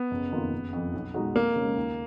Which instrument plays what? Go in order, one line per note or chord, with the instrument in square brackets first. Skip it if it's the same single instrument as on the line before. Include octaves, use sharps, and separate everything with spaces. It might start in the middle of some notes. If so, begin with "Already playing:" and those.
Already playing: [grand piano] B3
[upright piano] F#1
F2 D#3 A#3 F4
F#1
F2 F3
B1
B2 G#3 D#4 F#4
[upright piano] F2 [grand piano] A#3
[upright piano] C#3
G#3
D#2